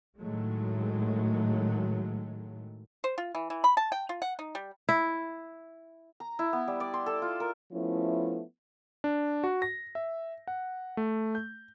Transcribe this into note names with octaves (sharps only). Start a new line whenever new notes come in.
A2 D#3 F#3 G#3 A3
C5
F4
E3
E3
B5
A5
G5
F4
F#5
D#4
G3
E4
A#5
E4
B3
G3
D5
C6
A4
F4
A#4
F3 A3 B3 C#4 E4
D4
F#4
A#6
E5
F#5
A3
G6